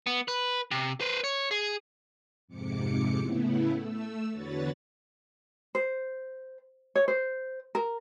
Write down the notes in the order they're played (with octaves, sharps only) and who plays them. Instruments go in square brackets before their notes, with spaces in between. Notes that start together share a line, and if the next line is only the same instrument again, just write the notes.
[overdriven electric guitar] B3
B4
C3
B4 C5
C#5
G#4
[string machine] F2 G#2 C3 D6 C#7
A2 C#3 A3 B3 E4
A3 E6
E2 D3 F#4 B4 C#5 A6
[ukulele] C5
C#5
C5
A#4